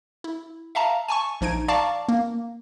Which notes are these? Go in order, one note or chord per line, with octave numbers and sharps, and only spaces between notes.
E4
E5 F5 A5 A#5
G#5 A5 C#6
A#1 F3 D#4 G#6 D7
D5 F5 A5 A#5 C#6 D6
A#3